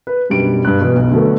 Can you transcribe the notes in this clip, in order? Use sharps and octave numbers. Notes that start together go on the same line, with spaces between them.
B4
F#2 B2 G3 D4 D7
G2 F#6
B2 E3 B3
B1
D3 F#3 A3 B3 A4